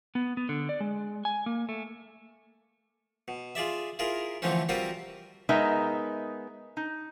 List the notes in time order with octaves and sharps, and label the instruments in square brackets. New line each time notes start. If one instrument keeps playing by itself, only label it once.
[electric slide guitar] B3
B3
D3
D5
G#3
G#5
A#3
A3
[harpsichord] B2
F4 G#4 D5 E5
E4 F4 G#4 A#4
D3 E3 F3 A3 C4 C#4
G3 C4 F4 F#4 A#4 B4
[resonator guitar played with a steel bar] G#3 B3 D#4 A#4 E5
D#4